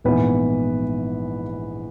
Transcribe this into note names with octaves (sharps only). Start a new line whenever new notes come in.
A#1 G#2 E3 B3 B4